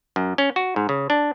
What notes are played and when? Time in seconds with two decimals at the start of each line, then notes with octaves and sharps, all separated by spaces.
0.16 F#2
0.38 C#4
0.56 F#4
0.76 G#2
0.89 C#3
1.10 D4